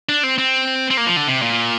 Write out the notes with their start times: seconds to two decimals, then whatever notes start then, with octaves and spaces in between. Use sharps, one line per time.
0.09 D4
0.23 C4
0.38 C4
0.90 C4
0.97 A#3
1.07 F3
1.17 D3
1.27 C3
1.42 A#2